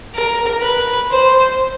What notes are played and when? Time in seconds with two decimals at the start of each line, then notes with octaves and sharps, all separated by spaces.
0.14 A#4
0.62 B4
1.10 C5